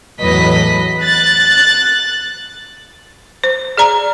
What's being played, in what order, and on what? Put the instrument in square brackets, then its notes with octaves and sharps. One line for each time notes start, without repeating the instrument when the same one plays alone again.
[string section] E2 A2 F#3 B4 D#5 B6
F#6 A6
[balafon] C5
G#4 D5 A#5